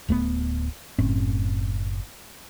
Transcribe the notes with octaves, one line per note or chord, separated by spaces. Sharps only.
D1 A3 B3
F#1 A2 C4 C#4